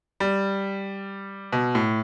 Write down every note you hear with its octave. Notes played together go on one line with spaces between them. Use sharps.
G3
B2
A2